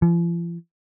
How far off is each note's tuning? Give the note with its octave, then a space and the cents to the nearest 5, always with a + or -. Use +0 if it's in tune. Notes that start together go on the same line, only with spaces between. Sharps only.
F3 -45